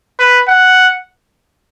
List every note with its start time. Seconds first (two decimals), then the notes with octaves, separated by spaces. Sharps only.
0.19 B4
0.48 F#5